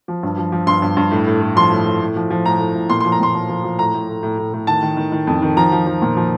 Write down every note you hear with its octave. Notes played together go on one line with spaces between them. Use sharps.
F3
G2
F3
F3
G2 C6
G2
G2
A2
A2
A2
F3 C6
A2
A2
A2
F3
F3
A2 A#5
A2
A2
A#2 C6
C6
F3
A#5
A#2 C6
F3
F3
F3
A2 A#5
A2
A2
A2
A2
A2
D#3 A5
D#3
D#3
D#3
F2
D#3
F3 A#5
F3
F3
A#2
F3